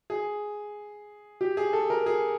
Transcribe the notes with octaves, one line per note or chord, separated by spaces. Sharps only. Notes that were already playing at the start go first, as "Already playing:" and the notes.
G#4
G4
G#4
A4
A#4
G#4